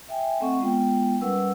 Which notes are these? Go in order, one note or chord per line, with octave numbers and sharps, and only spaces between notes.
E5 G5 G#5
A3 C4 A4 D#5 F#5 C#6
G#3 B3 F4 G5
G3 C#4 A#4 B4 F#5 E6